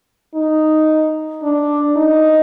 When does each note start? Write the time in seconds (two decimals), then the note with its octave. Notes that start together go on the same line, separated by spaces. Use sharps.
0.35 D#4
1.43 D4
1.97 D#4